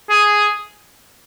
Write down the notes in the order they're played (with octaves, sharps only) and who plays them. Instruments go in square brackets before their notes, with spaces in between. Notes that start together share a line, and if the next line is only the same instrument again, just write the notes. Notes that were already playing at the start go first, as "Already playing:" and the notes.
[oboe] G#4